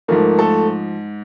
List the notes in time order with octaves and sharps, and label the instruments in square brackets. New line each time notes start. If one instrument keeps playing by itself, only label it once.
[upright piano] G#2 F3 A3 A#3 A#4
A3 A4